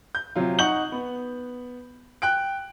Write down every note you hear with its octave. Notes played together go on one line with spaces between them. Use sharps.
G6
C3 F#3 F4
D#4 F#5 C#6 G6 F#7
B3
G5 F#6 D7